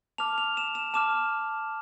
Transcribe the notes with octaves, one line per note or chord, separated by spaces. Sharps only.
A5 D6 F6 F7
F7
E7
E7
A5 D6 F6 E7